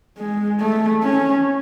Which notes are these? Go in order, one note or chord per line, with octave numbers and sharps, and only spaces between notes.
G#3
A3
C#4